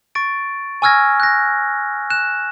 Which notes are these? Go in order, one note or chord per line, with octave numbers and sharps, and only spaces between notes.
C#6 A6 D7
G#5 C#6 E6 F6 G#6 A#6
F#6 A#6
F#6 E7